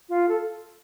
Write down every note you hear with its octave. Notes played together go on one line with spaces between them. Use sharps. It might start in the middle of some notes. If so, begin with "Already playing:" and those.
F4
A4